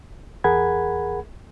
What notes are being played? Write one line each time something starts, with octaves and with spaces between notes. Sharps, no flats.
E2 G#4 A#4 F#5 B5 G#6